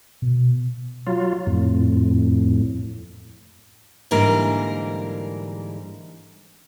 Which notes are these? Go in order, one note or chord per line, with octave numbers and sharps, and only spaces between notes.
B2
F#3 F4
F2 A2
G#2 D3 E3 G3 A#3 A#4